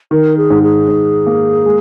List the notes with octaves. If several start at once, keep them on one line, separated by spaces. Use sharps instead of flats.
D#3 A#4
G#4
G#2
G#4
G#2
A#3
G#3